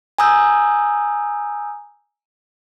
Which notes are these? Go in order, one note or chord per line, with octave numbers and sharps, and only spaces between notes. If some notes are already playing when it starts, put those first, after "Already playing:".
G#5 A#5 D#6 E6 G6